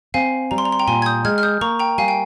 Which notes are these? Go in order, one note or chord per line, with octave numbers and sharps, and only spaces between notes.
C4 F5 G#5
G3 A#5
C6
A#5
C6
G5 A#5
A#2 G#5 C6
G#6
D#6 G6
G#3 F6 G#6
F6
D#6 G6
A#3 A#5 C#6
G5 A#5
G3 F5 G#5
G5